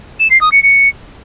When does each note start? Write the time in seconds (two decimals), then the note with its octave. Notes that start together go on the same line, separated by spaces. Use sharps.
0.20 E7
0.30 C7
0.41 D#6
0.52 C#7
0.63 C#7